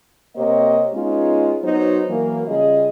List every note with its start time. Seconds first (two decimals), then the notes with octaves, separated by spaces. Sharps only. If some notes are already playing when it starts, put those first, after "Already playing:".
0.37 C3 A#3 G4 C5 C#5 D#5
0.93 G#3 B3 C#4 D#4 F4
1.64 F#3 B3 D#4 C5
2.09 E3 F#3 A#3
2.47 C#3 G3 F4 G#4 D#5